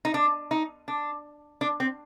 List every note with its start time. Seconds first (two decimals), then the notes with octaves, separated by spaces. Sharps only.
0.05 D#4
0.14 D4
0.51 D#4
0.88 D4
1.61 D4
1.80 C4